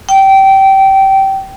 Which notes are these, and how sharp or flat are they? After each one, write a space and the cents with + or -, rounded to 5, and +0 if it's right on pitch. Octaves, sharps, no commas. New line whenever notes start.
G5 -20